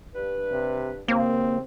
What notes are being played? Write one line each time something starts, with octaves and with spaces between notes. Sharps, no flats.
G2 B4
C3
D#2 C#3 A#3 C4